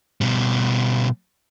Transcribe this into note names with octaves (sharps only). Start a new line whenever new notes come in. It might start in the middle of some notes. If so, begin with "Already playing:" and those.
B2 G3